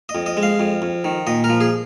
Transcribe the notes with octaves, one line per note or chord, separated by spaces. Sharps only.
D#5
F2
D#5
G#3
F5
F2
F2
D#3
A#2 D#5
A#4
F3
G#4